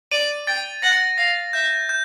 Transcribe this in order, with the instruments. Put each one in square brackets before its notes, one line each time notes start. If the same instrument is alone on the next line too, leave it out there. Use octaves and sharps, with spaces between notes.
[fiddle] D5 [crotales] D#7
[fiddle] G5 [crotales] A6
[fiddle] F#5 [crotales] A#6
[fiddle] F5 [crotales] A#6
[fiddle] E5 [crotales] G6
[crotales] G6